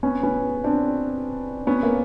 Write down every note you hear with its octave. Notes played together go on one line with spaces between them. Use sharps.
B3 C#4
B3 C#4
C4 D4
B3 C#4
A#3